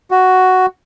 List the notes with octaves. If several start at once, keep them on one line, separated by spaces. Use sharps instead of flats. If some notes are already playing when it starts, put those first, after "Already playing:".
F#4